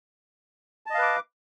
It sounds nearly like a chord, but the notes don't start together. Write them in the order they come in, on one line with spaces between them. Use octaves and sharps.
A5 D#5 F5 B4 D6